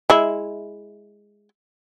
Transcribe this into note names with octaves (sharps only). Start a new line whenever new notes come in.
G#3 E4